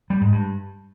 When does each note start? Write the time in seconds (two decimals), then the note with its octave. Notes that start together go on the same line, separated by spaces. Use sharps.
0.10 G3
0.21 G#2
0.32 G2